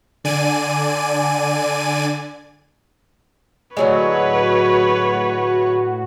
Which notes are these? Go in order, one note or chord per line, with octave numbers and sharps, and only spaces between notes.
D3 D5 G#5 D#7
A2 D3 F#3 G#3 F#4 B4 C#5